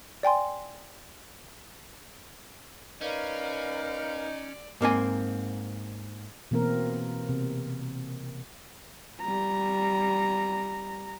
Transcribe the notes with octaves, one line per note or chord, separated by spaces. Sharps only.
D5 G5 G#5 C6
C#4 D#4 A#4 B4 D5 F5
G#2 A#3 C4 G#5
B2 E3 A#3 C4 A#4
C3
G3 A#5